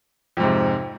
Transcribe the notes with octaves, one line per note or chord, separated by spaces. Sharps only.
F2 G#2 C3